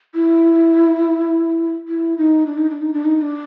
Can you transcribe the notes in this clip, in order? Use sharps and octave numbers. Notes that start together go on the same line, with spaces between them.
E4
E4
D#4
D4
D#4
D4
D#4
D4
D#4
D#4
D4